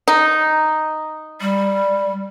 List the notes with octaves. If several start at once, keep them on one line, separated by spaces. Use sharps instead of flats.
D#4
G3